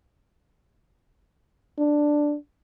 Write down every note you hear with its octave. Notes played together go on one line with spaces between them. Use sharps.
D4